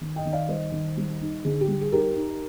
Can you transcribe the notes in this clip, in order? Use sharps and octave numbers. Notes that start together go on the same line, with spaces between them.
D#3
D#5 G5
D#3
D5 F5
G3 C5 D#5
D#3
G3
D#4
D3 G#4
G4
G3
G#4
D#4 G4 A#4
D#4